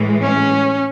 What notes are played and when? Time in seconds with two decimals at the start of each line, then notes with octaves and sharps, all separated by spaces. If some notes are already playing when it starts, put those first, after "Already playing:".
Already playing: A2 E3 G#3
0.22 C#4